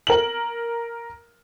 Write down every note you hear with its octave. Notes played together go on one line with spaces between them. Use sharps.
A#4 F#7